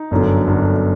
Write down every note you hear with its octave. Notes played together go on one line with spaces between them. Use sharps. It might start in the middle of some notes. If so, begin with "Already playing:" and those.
Already playing: D#4
G1 F#2 D3
G1 F#2 D3